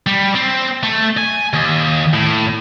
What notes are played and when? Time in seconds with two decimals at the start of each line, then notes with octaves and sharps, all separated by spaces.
0.07 G3
0.35 C4
0.83 A3
1.17 G#5
1.54 D#2
2.14 A2